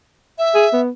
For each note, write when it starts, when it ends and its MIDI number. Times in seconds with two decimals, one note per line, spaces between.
0.38 0.81 76
0.55 0.67 68
0.73 0.90 59